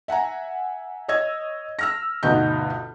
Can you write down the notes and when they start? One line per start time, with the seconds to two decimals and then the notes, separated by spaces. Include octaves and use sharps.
0.08 E5 F#5 G#5 A#5
1.08 C#5 D#5 E6 G#6
1.79 E6 F6 A#6
2.23 G1 D2 B2 D#4 G6